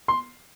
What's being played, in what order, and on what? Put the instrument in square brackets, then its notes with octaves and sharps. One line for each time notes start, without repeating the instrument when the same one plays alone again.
[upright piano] C6